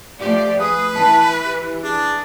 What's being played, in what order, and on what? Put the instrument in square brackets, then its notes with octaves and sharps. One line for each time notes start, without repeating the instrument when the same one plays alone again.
[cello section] F3 A3 G4 [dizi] D5
[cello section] G#4 [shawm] B4 [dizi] D#6
[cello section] E3 [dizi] A5
[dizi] G4
[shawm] D4 [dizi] G#4